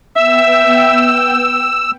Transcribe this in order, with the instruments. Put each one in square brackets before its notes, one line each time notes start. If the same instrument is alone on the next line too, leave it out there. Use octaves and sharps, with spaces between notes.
[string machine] B3 G5 [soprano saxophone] E5 [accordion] E6